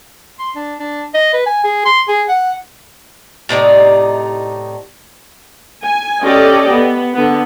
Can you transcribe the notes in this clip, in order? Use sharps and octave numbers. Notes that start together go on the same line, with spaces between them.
C6
D4
D4
D#5
B4
G#5
G#4
C6
G#4
F#5
A2 C3 D#4 D5
G#5
C#4 G4 A4 D5 D#5
B3
D3 B3